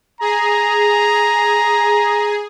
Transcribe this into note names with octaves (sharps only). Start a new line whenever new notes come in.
G#4 A#5